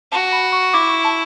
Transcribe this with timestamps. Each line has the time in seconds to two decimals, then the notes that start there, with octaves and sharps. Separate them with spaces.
0.12 F#4 A5
0.32 B5
0.52 C#6
0.73 E4 D6
0.89 C#6
1.04 A5